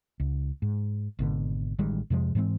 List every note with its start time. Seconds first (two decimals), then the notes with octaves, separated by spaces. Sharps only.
0.20 C#2
0.62 G#2
1.19 G#1 B2 D3
1.79 A1 D#3 G3 G#3
2.10 F2 C3 F3 G#3
2.35 G#2 E3 G#3 C4